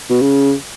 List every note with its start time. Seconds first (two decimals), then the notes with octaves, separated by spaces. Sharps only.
0.10 B2
0.22 C#3